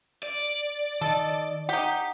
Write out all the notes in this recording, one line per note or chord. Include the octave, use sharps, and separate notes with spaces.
D5
D#3 A4 D#5
D#4 G4 F#5